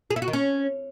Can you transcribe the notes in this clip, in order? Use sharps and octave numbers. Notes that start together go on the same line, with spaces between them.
G#4
E4
F#4
D#3
C#4